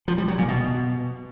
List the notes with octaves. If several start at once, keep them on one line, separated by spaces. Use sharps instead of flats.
F3
G3
F#3
A#2
B2